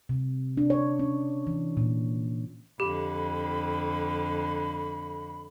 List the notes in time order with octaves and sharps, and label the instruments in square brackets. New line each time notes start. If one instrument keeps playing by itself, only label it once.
[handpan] C3
D4
C#5
C#4
E3
A#2
[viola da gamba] F2 D3 [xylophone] G4 [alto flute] B5